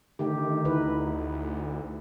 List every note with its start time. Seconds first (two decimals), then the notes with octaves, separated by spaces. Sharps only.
0.19 D3 D#3 A3 G4
0.65 D2 D#4 E4 B4